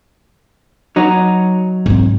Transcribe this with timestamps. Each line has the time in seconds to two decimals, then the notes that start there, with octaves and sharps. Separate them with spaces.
0.96 F#3 D#4
1.86 G#2 C4